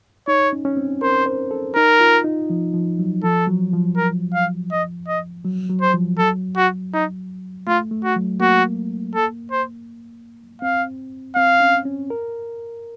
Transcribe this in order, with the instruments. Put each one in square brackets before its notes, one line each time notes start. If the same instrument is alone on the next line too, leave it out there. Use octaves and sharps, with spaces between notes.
[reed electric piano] D#4 [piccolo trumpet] C#5
[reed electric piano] C#4
C#4
C4
[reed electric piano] A#4 [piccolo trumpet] C5
[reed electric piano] C5
A4
[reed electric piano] D#4 [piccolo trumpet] A#4
[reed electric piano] F4
D#4
F3
F3
F#3
[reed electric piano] F3 [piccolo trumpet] A4
[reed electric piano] F#3
F3
[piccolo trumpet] A#4
F5
D#5
D#5
[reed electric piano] F#3
F#3
[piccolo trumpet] C5
[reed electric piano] F3
[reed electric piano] F#3 [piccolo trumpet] A4
[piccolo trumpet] F#4
D#4
[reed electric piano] A3 [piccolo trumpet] F4
[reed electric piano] A3
[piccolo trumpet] F#4
[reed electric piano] F#3
[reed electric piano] A#3 [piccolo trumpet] F#4
[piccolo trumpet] A4
C5
[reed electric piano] C4 [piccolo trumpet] F5
[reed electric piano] C4 [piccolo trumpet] F5
[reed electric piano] C#4
C#4
A#4